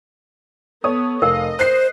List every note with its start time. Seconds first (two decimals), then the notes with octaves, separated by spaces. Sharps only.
0.84 B3 A4 C#5 D#6
1.22 F1 A#4 D#5 F5
1.59 C5 F#6 C7